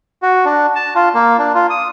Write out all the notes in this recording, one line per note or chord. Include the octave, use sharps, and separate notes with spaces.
F#4
D4
A5
F4
A#3
D4
F4
D#6